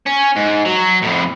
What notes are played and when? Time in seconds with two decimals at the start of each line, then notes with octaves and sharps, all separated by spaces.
0.07 C#4
0.36 G#2
0.65 F#3
1.02 F2 A2